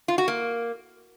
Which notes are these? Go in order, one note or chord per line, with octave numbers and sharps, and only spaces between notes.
F4
F#4
A#3